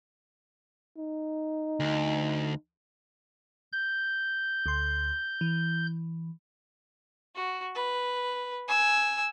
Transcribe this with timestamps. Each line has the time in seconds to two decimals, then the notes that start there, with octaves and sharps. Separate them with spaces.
0.97 D#4
1.80 D2
3.73 G6
4.66 D2 C6
5.41 E3
7.35 F#4
7.75 B4
8.68 G#5 E6